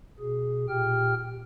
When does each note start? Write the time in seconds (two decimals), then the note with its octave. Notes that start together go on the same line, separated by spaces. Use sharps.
0.19 B2 G#4
0.69 A#2 G4 G5 F6